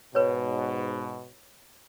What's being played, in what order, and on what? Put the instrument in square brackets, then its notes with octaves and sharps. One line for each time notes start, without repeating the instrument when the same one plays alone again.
[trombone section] G#2 B2 [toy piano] B4 C#5